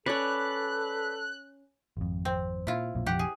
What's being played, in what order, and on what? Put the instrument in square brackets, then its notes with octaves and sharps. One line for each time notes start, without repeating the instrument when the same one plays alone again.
[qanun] C#4 C#5 [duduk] A4 [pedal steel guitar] B4 D5 [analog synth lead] F#6
[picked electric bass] G#1 F2
[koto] C4
[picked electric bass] A#2 [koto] E4 F4
[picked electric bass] B1 F2 A#2
[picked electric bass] F1 A#1 F2 [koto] G4 F#5
[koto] G#4